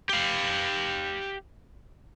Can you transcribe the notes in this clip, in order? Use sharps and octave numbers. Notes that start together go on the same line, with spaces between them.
G4 F5